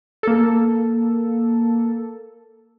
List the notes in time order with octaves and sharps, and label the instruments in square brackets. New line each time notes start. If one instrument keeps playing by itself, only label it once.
[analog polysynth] A#3 A4